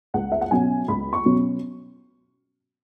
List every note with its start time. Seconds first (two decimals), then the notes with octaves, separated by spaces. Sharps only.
0.14 C#2 F#5
0.32 E5
0.41 F#5
0.51 B2 F#3 C#4 G#5
0.88 C#2 B5
1.13 C#6
1.25 B2 F#3 C#4